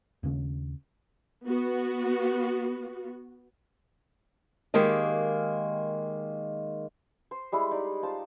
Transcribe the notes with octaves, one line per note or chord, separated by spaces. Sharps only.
D#2 C#3 C#4
B3 F#4
D#3 G#3 A#3 G4 D#5
C5
G3 G#3 E4
D#4 D5
F4 C5 A5